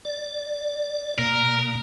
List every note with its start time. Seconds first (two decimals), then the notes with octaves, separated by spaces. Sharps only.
0.05 D5
1.19 B2 A#3 A#4